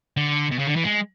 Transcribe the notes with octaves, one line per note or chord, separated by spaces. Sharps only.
D3
B2
C#3
D3
E3
G#3